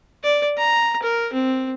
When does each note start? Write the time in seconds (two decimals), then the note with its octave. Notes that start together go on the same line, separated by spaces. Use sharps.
0.23 D5
0.58 A#5
1.03 A#4
1.33 C4